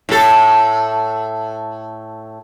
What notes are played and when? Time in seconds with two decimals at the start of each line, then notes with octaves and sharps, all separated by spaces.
0.09 A2 A4